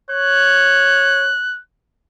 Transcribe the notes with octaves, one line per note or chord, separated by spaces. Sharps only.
C#5 F#6